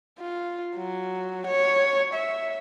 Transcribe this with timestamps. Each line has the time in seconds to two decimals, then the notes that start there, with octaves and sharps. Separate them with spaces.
0.19 F4
0.76 F#3
1.47 C#5
2.14 E5